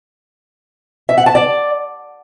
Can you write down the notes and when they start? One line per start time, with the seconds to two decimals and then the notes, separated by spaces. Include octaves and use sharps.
1.09 E5
1.18 F#5
1.26 A5
1.35 D5